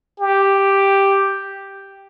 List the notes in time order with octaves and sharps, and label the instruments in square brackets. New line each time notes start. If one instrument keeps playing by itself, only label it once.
[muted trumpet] G4